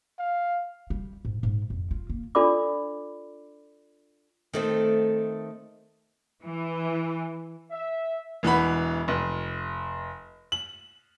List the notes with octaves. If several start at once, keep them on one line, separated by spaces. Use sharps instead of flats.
F5
G3
G#2
G#2
F2
F4
A#3
D4 F4 A4 D5 B5 D6
D#3 A3 C4
E3
E5
E1 E3 F#5 B5
F1
F#7